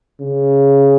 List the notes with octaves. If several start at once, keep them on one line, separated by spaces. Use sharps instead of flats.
C#3